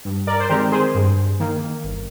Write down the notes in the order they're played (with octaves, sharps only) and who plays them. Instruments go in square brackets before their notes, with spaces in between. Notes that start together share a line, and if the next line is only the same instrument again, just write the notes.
[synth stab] G2
A#4 D5
C5
D#3 G#3 C4 G4 A#4
G#4 C5
G2
D#3 A#3
G1